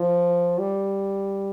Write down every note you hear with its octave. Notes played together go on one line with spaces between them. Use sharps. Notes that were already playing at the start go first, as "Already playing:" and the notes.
Already playing: F3
G3